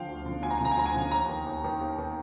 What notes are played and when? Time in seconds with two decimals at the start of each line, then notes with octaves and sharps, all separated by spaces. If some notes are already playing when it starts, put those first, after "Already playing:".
Already playing: D3 F3 F5 G5
0.09 D2
0.25 D3 F3
0.42 D2 G#5
0.50 A#5
0.58 G#5
0.60 D3 F3 A#5
0.72 G#5
0.77 D2 A#5
0.86 G#5
0.94 D3 F3
1.11 D#2 A#5
1.29 D#3
1.46 D#2
1.64 D#3
1.81 D#2
1.98 D#3